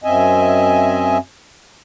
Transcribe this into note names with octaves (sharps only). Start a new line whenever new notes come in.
F#2 C4 D#5 E5 G#5